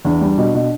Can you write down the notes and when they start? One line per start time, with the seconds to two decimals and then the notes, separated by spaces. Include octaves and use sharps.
0.05 E2 D4
0.21 G3
0.38 B2
0.55 B2